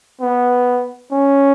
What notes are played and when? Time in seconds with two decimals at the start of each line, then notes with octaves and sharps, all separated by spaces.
0.21 B3
1.12 C#4